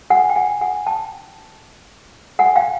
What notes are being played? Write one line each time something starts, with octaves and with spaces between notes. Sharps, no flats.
F#5 G#5
G5
F#5 G#5
F#5 G#5
G5 A5
F#5 G#5
F5 G5